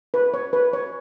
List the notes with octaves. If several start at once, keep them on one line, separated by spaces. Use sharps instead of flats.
B4
C#5
B4
C#5